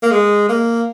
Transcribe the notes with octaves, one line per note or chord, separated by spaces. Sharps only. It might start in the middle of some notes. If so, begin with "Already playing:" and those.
A#3
G#3
A#3